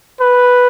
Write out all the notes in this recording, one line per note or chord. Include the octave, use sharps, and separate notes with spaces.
B4